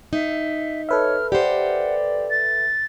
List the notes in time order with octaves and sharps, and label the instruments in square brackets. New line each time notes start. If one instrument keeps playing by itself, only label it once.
[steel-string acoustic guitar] D#4 [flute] E5
[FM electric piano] A4 B4 E5 [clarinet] C#5 [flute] F6
[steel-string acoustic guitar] G4 C5 [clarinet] D5 [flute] F#5
[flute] A6